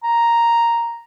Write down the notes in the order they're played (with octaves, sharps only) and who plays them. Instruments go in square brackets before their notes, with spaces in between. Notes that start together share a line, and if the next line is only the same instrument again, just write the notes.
[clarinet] A#5